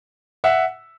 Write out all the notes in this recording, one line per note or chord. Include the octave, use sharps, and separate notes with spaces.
E5 F#5